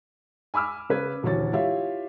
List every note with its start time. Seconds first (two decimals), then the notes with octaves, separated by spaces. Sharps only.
0.54 G#5 B5 D6 E6 F6
0.89 C#3 B4 G#6
1.23 D#1 D2 E3 F#4 C#5 A6
1.53 E4 F4 G4 C#5 E5 F5